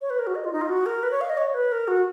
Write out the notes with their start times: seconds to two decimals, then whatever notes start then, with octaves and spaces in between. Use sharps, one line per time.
0.01 C#5
0.10 B4
0.19 A#4
0.27 F#4
0.35 D#5
0.44 F4
0.53 D#4
0.61 F4
0.69 F#4
0.86 A#4
1.03 B4
1.11 C#5
1.21 F5
1.29 D#5
1.37 C#5
1.54 B4
1.72 A#4
1.88 F#4